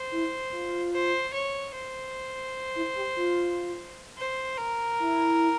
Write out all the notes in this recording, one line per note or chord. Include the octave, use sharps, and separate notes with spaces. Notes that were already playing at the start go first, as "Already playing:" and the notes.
Already playing: C5
E4
F4
C5
C#5
C5
E4
G4
F4
C5
A#4
E4